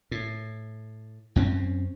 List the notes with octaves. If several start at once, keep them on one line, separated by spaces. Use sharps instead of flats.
A2
F#2 C4 C#4